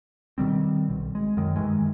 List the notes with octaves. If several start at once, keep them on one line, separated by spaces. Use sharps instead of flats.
B2 D#3 G3 C4
B1
G#3
F#2 D#3
G2 D#3 E3 G#3